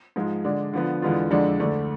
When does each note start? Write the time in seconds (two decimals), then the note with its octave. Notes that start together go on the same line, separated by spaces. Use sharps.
0.16 G#2 F3 G#3
0.45 D3 G#3 D4
0.73 D3 F3 B3
1.02 E2 D3 G#3 B3 F4
1.31 F2 D3 G#3 D4 A4
1.60 D2 D3 A3 D4